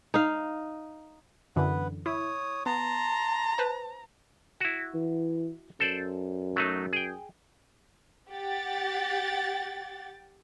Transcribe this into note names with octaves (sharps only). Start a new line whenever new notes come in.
D#4 F5
F#2 D3 E3 B3 B4
E4 C#5 D#6
B3 A5 A#5 C6
B4 C5 A5
E4 F#4
E3
F#2 A4 C5 D5
F#3 A3 D#4
G#4 G5
G4 F#5 G5 A6